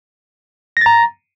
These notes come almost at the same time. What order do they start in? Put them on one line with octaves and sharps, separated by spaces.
A#6 A6 A#5